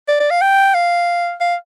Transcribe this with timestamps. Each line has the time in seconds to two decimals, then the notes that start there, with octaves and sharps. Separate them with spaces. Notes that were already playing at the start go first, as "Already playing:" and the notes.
0.08 D5
0.20 D5
0.31 F5
0.41 G5
0.74 F5
1.41 F5